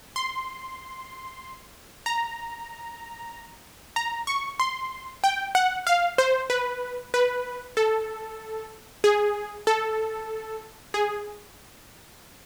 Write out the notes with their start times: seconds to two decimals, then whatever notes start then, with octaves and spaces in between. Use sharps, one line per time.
0.16 C6
2.06 A#5
3.96 A#5
4.27 C#6
4.60 C6
5.24 G5
5.55 F#5
5.87 F5
6.18 C5
6.50 B4
7.14 B4
7.77 A4
9.04 G#4
9.67 A4
10.94 G#4